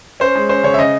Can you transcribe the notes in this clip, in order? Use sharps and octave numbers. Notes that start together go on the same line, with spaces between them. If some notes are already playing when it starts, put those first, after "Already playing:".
C#4 C5
G#3
C#4 C5
C#3 C#5
E5
C#3 D#5